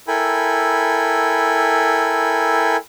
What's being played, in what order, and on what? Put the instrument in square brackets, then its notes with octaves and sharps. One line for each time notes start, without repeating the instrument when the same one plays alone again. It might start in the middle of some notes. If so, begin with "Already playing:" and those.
[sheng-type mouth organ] E4 A4 A#4 G5 G#5 B5